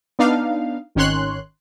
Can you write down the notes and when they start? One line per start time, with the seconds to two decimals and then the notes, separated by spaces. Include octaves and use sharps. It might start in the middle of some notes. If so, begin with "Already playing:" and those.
0.19 B3 D4 D#4 F5
0.95 G#1 D#3 C#4 C#5 C6 F#6